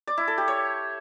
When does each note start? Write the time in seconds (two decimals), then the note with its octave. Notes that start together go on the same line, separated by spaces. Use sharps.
0.07 D5
0.18 E4
0.28 A4
0.38 G4
0.48 C#5